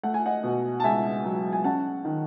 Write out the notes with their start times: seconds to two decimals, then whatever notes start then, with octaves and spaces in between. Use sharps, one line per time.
0.03 A3 F#5
0.14 G#5
0.26 D#5 F#5
0.43 B2
0.80 A5
0.84 C#2 E5 G#5
1.24 F#3
1.53 G#5
1.64 C#4 F#5 A5
2.05 D#3